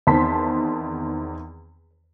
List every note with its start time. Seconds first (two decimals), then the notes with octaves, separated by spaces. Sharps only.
0.07 E2 D#3 C4 A5 C6 B6